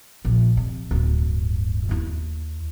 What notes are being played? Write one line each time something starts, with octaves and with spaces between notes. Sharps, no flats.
A#1
C3
D1 G2
D#2 E4